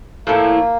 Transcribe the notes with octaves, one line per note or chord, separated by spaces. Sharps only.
A2 F3 A3 A#3 E4